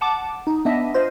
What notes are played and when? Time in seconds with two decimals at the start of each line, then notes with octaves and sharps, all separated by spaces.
0.01 F#5 A5 D6
0.47 D#4
0.65 B3 D4 D#5 E5
0.94 F4 C5 D#5